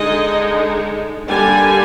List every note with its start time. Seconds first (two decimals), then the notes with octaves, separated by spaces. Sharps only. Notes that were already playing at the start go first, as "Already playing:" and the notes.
Already playing: D3 G#3 D#4 D#5
1.27 D3 G3 A#3 D4 G#5